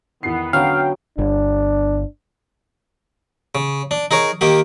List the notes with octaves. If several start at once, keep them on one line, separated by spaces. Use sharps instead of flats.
E2 D#3 B3 C7
D3 F#3 B3 C#4 F5 G5 D#6
G1 D4
C#3
D4
D#4 G#4 A#4 C#5
D#3 A#3 G4